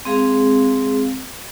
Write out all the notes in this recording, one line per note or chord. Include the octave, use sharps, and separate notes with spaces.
G#3 C4 G#4 F5